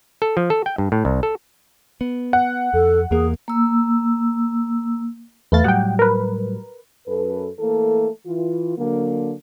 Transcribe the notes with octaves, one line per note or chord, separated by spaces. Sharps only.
A4
F3
A4
G5
G2
A2
C2
A4
B3
F#5
F2 A4
E2 A#3 G#4
A#3 E6
E2 A3 B4 F5 A6
A2 F#3 G3 F#5 G5
A#4 B4
F#2 A4 B4
E3 A3 A#3 A4
E3 F4
D3 F#3 A#3